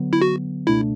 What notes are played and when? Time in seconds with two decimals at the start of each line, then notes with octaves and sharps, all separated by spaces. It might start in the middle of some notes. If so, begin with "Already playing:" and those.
Already playing: D3 F#3 B3
0.13 E4
0.21 F#4
0.67 C#2 B2 A3 D4 E4